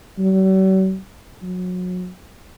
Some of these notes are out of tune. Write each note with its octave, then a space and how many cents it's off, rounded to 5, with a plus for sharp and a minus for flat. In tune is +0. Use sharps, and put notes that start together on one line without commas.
F#3 +45
F#3 -30